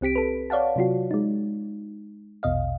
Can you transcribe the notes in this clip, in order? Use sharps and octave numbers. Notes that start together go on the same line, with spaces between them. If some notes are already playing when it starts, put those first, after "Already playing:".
C2 C4 G4 B6 D7
A4 B4
C#5 D5 F5 F#5 A5
C3 F#3 F4 F#4
G#3 D#4
A#1 E2 B2 D#5 F5